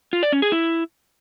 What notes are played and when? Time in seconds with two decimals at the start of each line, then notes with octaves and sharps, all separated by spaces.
0.13 F4
0.23 D5
0.32 C#4
0.42 G#4
0.52 E4